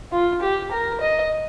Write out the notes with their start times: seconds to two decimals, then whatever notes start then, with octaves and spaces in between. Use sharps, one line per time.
0.12 F4
0.42 G4
0.72 A#4
1.01 D#5